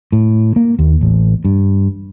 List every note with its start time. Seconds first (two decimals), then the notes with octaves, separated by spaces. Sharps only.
0.12 A2
0.56 A#3
0.79 D#2
1.01 A1
1.45 G2